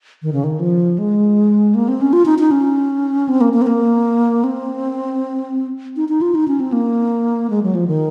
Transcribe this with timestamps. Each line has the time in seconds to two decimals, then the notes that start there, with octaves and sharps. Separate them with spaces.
0.23 D#3
0.33 C#3
0.44 D#3
0.60 F3
0.98 G#3
1.75 A#3
1.88 C4
2.01 C#4
2.13 F4
2.26 D#4
2.39 D#4
2.51 C#4
3.29 C4
3.41 A#3
3.53 A#3
3.62 C4
3.67 A#3
4.44 C4
5.96 D#4
6.09 D#4
6.21 F4
6.35 D#4
6.48 C#4
6.60 C4
6.72 A#3
7.50 G#3
7.63 F#3
7.75 F3
7.87 D#3